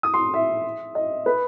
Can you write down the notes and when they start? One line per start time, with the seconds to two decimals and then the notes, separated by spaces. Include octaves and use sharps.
0.03 D#6
0.14 C6
0.34 E5
0.95 D#5
1.26 B4